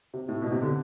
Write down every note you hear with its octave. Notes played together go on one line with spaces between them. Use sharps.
C3
A2
B2
C3
D3